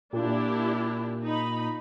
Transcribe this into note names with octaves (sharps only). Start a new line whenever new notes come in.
A#2 D4 E4 G4
D#4 B5